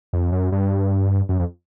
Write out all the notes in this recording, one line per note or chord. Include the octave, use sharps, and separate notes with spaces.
F2
F#2
G2
F#2
F2